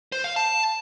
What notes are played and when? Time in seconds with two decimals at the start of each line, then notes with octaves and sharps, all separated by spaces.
0.12 C5
0.24 F5
0.36 A5